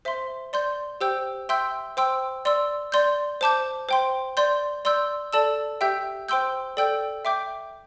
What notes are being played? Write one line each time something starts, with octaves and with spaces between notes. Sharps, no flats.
C5 E5 C6
D5 C6 G6
G4 C5 G5 E6 G6
E5 G5 C6 E6 G6
C5 G5 C6 E6
D5 C6 E6
D5 C6 G6
C5 A5 D6 G6
C5 G5 C6
D5 C6 G6
D5 C6 E6 G6
A4 D5 A5 E6
G4 E5 G5 E6 G6
C5 G5 C6 E6 G6
A4 D5 G5 E6 G6
E5 G5 D6 G6